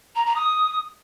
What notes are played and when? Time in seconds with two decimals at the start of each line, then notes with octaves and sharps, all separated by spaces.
0.15 A#5
0.25 A#5
0.35 D#6